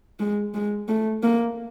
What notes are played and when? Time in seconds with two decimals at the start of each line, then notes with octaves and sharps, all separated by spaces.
0.19 G#3
0.54 G#3
0.88 A3
1.23 A#3